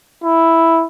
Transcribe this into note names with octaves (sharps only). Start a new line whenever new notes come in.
E4